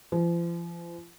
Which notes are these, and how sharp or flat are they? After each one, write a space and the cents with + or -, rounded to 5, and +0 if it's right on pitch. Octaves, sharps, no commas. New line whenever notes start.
F3 -40